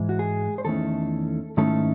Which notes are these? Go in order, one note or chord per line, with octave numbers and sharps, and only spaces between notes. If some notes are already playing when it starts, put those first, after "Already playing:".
Already playing: G#2 E3 G#3
F#4
G#4
C5
E2 D#3 A3 C#4 E4 A4
G#2 D#3 A3 C#4 E4 A4